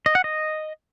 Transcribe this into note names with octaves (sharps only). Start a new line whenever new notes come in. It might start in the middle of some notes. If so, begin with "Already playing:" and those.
D#5
F#5
D#5